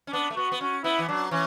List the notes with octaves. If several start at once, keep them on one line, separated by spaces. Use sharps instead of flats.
C#4
B3 D4
A3
B3 F#4
B3
C#4 F#4
B3 E4
E3
F#3 D4
E3 C#4